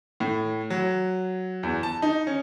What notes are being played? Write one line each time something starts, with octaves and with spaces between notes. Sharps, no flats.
A2
F#3
E2
A5
D#4
C#4